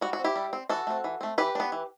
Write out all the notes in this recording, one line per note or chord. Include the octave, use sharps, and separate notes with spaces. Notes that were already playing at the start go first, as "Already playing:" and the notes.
G3 F#4
F#4
C4
E4 G4
G3
C4
E3 F#4 A4
A3 C4
E3
A3 C4
E3 G4 B4
B3 D4
E3